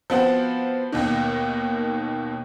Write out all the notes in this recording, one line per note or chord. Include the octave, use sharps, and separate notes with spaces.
F3 B3 C4 F#4
D#2 B2 D#3